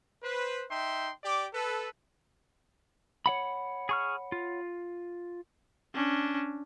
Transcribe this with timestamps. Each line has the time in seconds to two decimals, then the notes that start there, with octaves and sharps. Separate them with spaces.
0.23 B4 C5
0.70 D#4 E5 G5 C6
1.24 G4 D5 D6
1.54 A4 B4
3.26 C#5 F#5 B5
3.89 G#4 C#6 F6
4.32 F4
5.95 C#4 D4